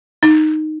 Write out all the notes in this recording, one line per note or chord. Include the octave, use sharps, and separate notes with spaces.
D#4